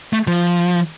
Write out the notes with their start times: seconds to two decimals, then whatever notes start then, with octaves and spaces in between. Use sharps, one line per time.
0.13 A3
0.27 F3